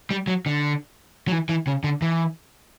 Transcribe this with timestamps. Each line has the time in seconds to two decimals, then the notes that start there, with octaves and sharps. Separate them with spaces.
0.10 G3
0.27 F#3
0.46 D3
1.28 F#3
1.32 E3
1.49 E3
1.67 C#3
1.84 D3
2.02 E3